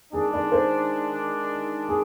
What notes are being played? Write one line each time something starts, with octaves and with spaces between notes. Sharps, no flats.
D#3 G#3 D4 G#4
D5
C5
G#4